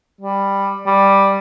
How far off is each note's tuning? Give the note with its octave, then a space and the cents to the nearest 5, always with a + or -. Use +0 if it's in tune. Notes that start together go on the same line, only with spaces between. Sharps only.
G3 +10
G3 +5